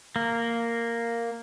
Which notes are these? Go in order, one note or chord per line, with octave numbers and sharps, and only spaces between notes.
A#3